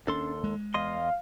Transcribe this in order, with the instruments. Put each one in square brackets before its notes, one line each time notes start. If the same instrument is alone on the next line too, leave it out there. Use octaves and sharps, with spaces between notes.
[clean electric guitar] D#2 A4 C6 [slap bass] C#4 D4
[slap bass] G#3
[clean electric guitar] E2 D#5 C6 [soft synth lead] F5